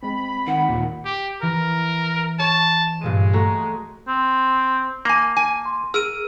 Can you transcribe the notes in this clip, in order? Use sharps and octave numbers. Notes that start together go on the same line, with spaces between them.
G#3 C4 B5
D#3 F#5
D#2 A#2
G4
E3 A#4
C#5 A5
G2 A#2 G#3 D#7
A3 F#4 A#5
C4
A#3 G#5 A#5
G#5
C6
G#4 A#4 E6 D#7